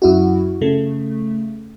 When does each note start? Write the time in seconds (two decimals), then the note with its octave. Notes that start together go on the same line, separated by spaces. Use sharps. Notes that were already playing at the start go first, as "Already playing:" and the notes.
0.02 F#2 E4 F#4
0.61 C#3 A3